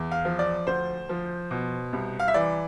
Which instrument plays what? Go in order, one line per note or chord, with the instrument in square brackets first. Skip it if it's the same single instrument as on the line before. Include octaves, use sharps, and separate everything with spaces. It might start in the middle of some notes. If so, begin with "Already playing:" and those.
Already playing: [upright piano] E2
F5
F3
D5
D2 C5
F3
B2
C2
F5
E5
E3 D5